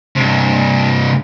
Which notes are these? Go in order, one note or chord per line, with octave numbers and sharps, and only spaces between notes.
G2 C3